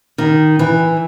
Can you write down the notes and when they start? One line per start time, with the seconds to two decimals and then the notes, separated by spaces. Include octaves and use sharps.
0.18 D#3
0.59 E3